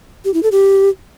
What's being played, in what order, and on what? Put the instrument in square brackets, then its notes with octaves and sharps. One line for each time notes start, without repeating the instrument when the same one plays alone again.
[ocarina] G4
E4
A4
G4